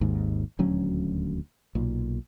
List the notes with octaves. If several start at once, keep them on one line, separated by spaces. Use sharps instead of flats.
G#1 D#2 G#2
D#1 D2 F#3 C#4
B1 A#2